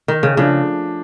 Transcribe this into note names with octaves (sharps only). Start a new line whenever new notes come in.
D#3
C#3
C#3 F3 A3 D4